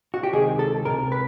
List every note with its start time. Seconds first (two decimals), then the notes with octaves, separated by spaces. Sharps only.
0.14 F#4
0.23 G4
0.33 C#2 C3 D#3 G#3 G#4
0.59 A4
0.85 C#2 C3 A#4
1.12 B4